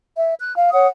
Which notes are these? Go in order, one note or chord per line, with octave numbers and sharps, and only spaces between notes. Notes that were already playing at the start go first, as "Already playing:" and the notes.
E5
F#6
F5
C#5 F#5 D#6